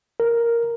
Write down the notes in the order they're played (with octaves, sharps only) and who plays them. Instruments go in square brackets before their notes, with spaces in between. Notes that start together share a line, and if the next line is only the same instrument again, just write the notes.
[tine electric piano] A#4